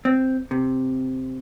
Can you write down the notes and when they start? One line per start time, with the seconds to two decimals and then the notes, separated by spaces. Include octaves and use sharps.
0.05 C4
0.51 C3